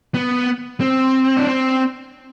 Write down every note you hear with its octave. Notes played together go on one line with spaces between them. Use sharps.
B3
C4
D4
C4